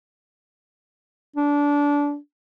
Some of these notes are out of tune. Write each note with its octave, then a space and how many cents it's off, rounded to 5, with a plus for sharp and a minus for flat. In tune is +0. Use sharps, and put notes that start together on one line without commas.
D4 -20